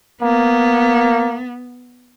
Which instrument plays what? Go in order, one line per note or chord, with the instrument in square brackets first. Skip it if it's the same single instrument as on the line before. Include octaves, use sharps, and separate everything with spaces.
[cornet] A#3 [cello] B3